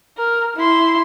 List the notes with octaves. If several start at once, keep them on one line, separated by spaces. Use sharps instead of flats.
A#4
E4 C6